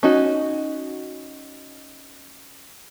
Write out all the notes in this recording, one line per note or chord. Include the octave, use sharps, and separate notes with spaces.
C#4 D#4 F#4